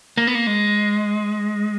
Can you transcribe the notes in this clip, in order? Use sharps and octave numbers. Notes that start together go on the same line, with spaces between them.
A#3
B3
A#3
G#3